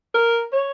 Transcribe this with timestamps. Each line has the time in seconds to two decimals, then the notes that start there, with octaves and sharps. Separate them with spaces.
0.14 A#4
0.52 C#5